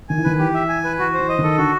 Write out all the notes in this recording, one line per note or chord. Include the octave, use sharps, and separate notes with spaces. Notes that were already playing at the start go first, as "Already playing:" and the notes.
D#3 G#5
E3
D#3 B4
E3 G4
E5
G#5
B4
E3 F#4
C5
E3
D#5
D#3 A4
D3 F#4